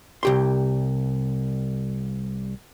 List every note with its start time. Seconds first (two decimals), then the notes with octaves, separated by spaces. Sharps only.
0.23 C2 G4 C6